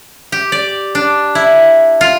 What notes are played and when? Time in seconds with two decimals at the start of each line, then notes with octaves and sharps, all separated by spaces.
0.32 G4
0.52 D5
0.95 D4
1.35 E4
2.01 F4